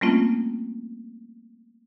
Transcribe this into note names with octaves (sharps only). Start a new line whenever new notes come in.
G3 A3 A#3 C4 C#4 F4